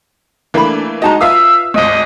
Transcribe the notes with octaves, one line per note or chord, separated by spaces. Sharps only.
E3 A3 A#3 D4 B5
G#3 D#4 F#4 D#5 A5 A#5
F4 B4 E5 F5 D#6 E6
G#1 D2 D#5